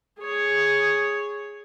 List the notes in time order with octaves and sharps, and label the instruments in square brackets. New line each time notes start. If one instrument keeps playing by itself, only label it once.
[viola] G#4 C#5